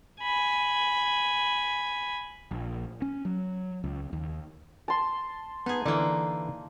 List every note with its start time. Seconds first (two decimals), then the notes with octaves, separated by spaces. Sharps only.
0.22 G#5 B5
2.51 A#1
3.02 C#4
3.25 F#3
3.84 C#2
4.13 D#2
4.88 A5 C6
5.66 B3 D#4 G#4
5.86 D3 E3 A#3 D#4 D5